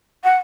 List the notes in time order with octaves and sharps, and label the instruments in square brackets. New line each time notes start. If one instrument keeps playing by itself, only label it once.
[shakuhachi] F#5